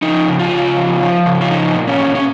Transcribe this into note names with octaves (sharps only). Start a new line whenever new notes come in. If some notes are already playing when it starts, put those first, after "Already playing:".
F3 D#4
C#3
F4
C#3
F3
F3
C#3
F4
F3 D#4
A#2
C#4
A#2
C#4